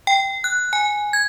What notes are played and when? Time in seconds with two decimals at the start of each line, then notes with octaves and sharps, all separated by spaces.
0.07 G5
0.44 F#6
0.73 G#5
1.13 G#6